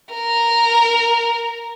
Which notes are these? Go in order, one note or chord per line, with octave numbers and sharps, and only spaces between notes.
A#4